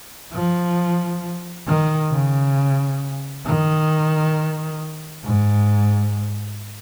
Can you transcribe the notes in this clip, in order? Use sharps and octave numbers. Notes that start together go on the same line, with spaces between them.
F3
D#3
C#3
D#3
G#2